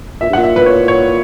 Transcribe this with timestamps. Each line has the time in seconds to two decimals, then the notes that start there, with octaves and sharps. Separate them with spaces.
0.21 A#2 E5
0.29 G2
0.33 A#2 F#5
0.43 E5
0.56 B4
0.66 C#5
0.88 C#5